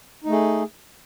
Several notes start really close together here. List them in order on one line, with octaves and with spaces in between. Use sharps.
D#4 A3 G#4